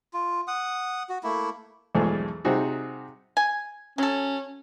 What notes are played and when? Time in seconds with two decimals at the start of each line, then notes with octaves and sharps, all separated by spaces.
0.14 F4
0.48 F#5 D#6
1.09 F#4
1.23 A3 A#3 E4
1.95 B1 E2 G#2 F3 A3
2.45 C3 G3 C4 D#4 F#4 G#4
3.37 G#5
3.98 F#3 C#4 A4